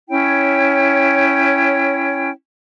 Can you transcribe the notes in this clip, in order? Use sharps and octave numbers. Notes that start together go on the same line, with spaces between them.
C#4 E4 C#5 G5